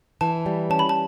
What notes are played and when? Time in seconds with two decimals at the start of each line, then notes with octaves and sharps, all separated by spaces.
0.21 E3 A5
0.46 G3
0.70 C#4 A5
0.79 B5
0.89 A5